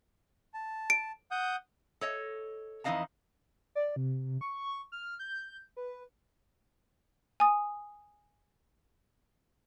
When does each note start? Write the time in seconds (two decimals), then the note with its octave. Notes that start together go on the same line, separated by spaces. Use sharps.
0.54 A5
0.90 D7
1.31 F#5 D#6 G6
2.01 A4 C#5 D#5
2.84 F2 E3 D#4 D#5 F5 A5
3.75 D5
3.96 C3
4.41 C#6
4.92 F6
5.19 G6
5.77 B4
7.40 G#5 D#6